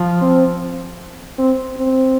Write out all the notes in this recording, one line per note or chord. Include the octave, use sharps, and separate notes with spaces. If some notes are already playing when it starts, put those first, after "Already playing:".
Already playing: F3
C4
C4
C4